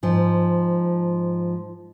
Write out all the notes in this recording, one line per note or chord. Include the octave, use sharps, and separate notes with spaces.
G#2 F3